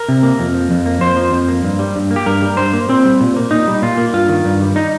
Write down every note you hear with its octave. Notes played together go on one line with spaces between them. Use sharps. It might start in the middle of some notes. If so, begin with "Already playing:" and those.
Already playing: A#4
C3
A#3
F2
F3
F2
A#3
F2 C5
F3
F2
A#3
G2
G3
G2
A#3
G4
G2 A#4
G3
G2 C5
A#3
A#2 C4
G3
A#2
A#3
A#2 D#4
G3
A#2 F4
A#3
G2 F4
D#3
G2
G3
D#4